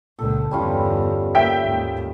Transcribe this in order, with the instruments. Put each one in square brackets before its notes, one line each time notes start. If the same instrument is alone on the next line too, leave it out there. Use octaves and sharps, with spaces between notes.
[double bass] C#2 A#2 [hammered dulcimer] A4
[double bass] G1 E2 [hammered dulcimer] G3 C#4 F4
[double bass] A#3 [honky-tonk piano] E5 G5 B6
[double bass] D#2 G#2